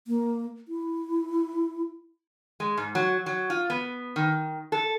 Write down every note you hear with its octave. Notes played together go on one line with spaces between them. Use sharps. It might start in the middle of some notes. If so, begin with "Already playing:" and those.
A#3
E4
G#3
G#2
F#3
F#3
F4
B3
D#3
A4